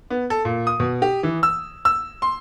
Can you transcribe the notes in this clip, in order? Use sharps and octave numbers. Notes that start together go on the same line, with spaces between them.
B3
A4
A#2
D#6
B2
G4
E3
E6
E6
C6